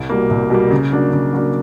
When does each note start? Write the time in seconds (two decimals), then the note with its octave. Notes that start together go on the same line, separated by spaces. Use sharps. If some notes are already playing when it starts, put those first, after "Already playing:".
Already playing: C2
0.10 B2 G3 A#3
0.31 C2
0.50 B2 G3 A#3
0.71 C#3
0.92 F#3 A#3 D4
1.13 C#3
1.33 F#3 A#3 D4